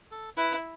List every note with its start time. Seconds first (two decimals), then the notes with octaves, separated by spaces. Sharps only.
0.11 A4
0.37 E4 B4